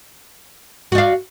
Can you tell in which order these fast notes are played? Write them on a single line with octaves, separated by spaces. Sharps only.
F#4 D5 F5